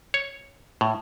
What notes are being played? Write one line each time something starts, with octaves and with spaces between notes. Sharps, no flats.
C#5
A2